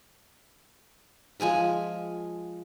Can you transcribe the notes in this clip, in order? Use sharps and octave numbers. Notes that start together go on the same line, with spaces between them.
F3 G#3 G#5 B5